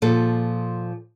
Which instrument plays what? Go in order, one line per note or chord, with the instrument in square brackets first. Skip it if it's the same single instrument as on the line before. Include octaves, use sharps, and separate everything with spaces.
[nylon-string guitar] A#2 F3 A4